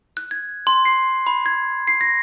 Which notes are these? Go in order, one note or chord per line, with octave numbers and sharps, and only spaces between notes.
F#6
G#6
C6
C7
B5
G#6
C7
A#6